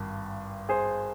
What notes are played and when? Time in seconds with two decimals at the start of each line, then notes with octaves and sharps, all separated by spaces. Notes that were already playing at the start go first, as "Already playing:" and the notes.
Already playing: G#1 G2
0.69 G#4 C5